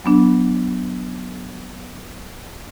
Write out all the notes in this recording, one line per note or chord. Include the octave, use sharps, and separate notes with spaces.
F#3 B3 D4